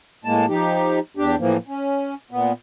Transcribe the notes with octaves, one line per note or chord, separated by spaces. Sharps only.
A2 G#3 A#3 A5
F3 D#4 G4
E2 D4 G4
A2 E3 F3 A#3
C#4
A#2 B3